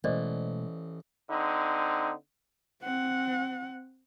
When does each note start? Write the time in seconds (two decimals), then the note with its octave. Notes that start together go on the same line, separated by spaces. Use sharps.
0.04 A1 B2 G#3 A3 C5 D5 D#5
1.30 D3 C4 D#4
2.82 C4 F#5